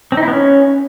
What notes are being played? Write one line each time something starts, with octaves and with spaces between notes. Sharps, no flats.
C4
D#4
E4
B3
C#4